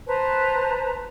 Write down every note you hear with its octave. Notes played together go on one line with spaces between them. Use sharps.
B4 C5 A5 A#5